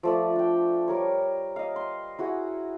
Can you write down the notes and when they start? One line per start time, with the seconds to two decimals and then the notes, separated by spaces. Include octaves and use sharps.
0.03 F3 A3 D5
0.36 D4 G5
0.88 G3 A#4 C#5
1.56 D#5 F5
1.76 C6
2.18 E4 F#4 G#4 F#5